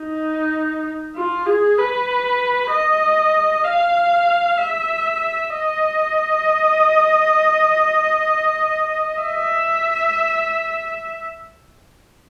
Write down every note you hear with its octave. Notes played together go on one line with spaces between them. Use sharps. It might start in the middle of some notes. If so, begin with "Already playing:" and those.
Already playing: D#4
F4
G#4
B4
D#5
F5
E5
D#5
E5